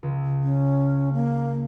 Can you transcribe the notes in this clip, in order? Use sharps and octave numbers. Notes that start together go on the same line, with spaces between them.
C#2
C#4
A#3